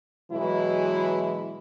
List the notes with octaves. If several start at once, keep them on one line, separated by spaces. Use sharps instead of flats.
B2 E3 F#3 G#3 E4